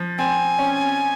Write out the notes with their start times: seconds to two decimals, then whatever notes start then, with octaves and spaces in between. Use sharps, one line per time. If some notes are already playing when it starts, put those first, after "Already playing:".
Already playing: F3
0.18 C4 G#5
0.59 C#4